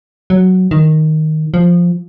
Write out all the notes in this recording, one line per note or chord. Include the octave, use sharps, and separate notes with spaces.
F#3
D#3
F3